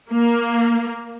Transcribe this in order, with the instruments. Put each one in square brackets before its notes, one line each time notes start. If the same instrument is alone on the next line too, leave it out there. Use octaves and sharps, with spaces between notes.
[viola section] A#3